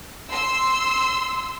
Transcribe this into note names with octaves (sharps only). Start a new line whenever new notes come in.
C6 E6